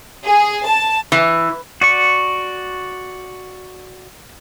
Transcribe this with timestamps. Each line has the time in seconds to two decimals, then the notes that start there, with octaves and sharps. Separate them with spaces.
0.24 G#4
0.66 A5
1.12 E3
1.81 F#4 D5 C#6